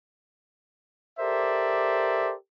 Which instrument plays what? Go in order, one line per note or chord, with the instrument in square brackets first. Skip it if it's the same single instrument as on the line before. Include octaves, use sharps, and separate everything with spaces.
[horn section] G4 A4 A#4 C5 D5 E5